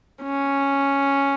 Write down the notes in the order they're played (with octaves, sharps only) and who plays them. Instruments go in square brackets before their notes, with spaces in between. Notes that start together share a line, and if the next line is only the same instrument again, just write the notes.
[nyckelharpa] C#4